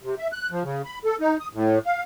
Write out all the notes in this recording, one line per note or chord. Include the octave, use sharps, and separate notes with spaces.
C3
E5
F#6
F3
C#3
B5
A4
D#4
D#6
A2
F5